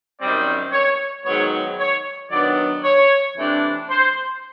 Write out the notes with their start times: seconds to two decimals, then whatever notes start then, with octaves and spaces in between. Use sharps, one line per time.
0.20 F#2 D#3 G3 C4 D5
0.72 C#5
1.25 G#2 D#3 F#3 B3 C#5
1.79 C#5
2.31 D#3 F#3 B3 D4 D5
2.84 C#5
3.37 C3 E3 A3 D4
3.90 C5